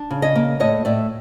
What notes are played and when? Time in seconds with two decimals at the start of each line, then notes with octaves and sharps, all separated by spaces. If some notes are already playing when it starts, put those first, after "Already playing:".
Already playing: D4
0.10 C#3
0.22 C#5 D#5
0.35 A#3
0.60 A2 C#5 D#5
0.85 A2 D5 E5